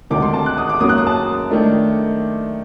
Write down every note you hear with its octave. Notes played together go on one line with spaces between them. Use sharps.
D2 C3 D#3 D6
C6
A5
F#6
D#6
D6
F#2 F#3 A#3 D#6
F#6
D#6
A5
D#3 A3 D4